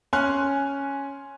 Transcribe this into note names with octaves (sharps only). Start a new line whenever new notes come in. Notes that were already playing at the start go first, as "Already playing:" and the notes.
C#4 G#5 C6 F6 F#6